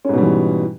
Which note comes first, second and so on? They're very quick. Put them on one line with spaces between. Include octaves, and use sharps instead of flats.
C#4 G#2 B2 G3 E3